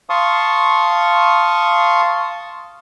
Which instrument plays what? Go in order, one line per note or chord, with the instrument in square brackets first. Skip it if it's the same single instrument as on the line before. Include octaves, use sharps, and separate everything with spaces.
[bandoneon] F5 A5 C6 C#6 D#6